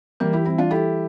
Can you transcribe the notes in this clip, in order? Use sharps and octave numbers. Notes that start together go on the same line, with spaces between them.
E3 G3 A#3
E4 G4
G3 C4 E4
D4 F4
E4 G4 A4